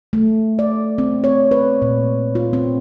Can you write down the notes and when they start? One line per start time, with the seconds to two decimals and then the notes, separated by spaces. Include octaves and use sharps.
0.13 A3
0.59 D5
0.98 C4
1.24 C#5
1.51 B4
1.82 A#2
2.35 F4
2.53 C4